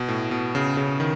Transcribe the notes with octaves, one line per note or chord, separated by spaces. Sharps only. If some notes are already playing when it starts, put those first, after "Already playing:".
Already playing: B2
A2
B2
C#3
C#3
D#3